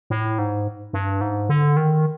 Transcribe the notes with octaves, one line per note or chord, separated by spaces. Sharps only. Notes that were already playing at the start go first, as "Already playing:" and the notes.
A2
G#2
G2
G#2
D3
D#3